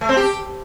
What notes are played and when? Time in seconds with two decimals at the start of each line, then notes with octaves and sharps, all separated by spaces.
0.01 A3
0.09 C4
0.17 G4